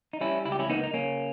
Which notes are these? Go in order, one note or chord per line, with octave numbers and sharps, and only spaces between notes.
D#4
G3 C#4 E4
C#2 E4
G4
C#4 E4
A#3 B3 D#4
D#4
C#3 A#3 C#4